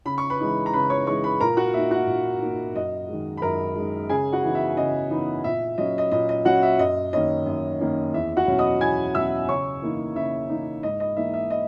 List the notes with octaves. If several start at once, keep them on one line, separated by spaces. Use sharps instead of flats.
C#3 B5
C#6
B4 B5
E3 G#3 D#4
A#5
C#3 B4 B5
C#5 C#6
E3 G#3 D#4 C#5 C#6
B4 B5
A#2 A#4 A#5
F#4 F#5
A#3 D#4 E5
F#4 F#5
A#2
A#3 D#4
F#2 D#5
D#3 G#3
B5
F#2 A#4 A#5
G#3
D#3
C#3 G#4 G#5
F#4 F#5
E3 B3 D#4
E5
C#3 D#5
E3 B3 D#4
A#2 E5
F#3 C#4 D#5
D#5
A#2 D#5
D#5
F#3 C#4 F#4 F#5
E5
F#2 D#5
D#3 A#3 C#4 D#5
F#2
D#3 A#3 C#4
E2 E5
F#4 F#5
B2 F#3 C#4
D#5 D#6
E2 G#5 G#6
B2 F#3 C#4 E5 E6
C#3 C#5 C#6
E3 A#3 D#4
C#3 E5
E3 A#3 D#4
G#2 D#5
D#5
E3 A#3 D#4 E5
E5
D#5